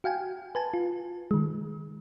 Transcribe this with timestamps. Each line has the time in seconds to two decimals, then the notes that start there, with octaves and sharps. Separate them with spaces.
0.04 F#4 F5 G5 G#5
0.55 B4 G#5 A5
0.74 F4
1.31 D#3 G#3